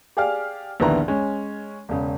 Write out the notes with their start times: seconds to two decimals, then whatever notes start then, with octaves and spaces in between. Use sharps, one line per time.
0.17 G4 G#4 D5 F5 F6
0.80 A#1 D#2 D3 B3 E4 A#5
1.08 G#3 C#4
1.89 E1 C#3